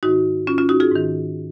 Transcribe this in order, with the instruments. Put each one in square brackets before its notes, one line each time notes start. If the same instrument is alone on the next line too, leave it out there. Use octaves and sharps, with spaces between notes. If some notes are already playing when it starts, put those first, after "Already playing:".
[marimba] G#2 D#3 D#4 F#4
C#4 F4
C#4 F4
D#4 F#4
F4 G#4
G#2 D#3